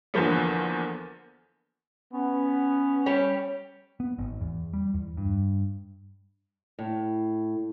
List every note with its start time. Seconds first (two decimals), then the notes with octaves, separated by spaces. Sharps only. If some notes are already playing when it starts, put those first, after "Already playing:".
0.14 E2 D3 F3 A#3 B3
2.13 B3 C#4
3.06 G3 G4 C#5
4.00 B3
4.18 G#1
4.41 E2
4.73 G3
4.94 E2
5.17 G2
6.79 A2